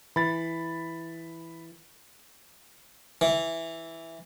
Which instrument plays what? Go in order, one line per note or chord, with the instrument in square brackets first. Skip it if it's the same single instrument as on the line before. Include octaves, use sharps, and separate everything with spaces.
[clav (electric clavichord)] E3 [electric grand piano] B5 A6
[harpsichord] E3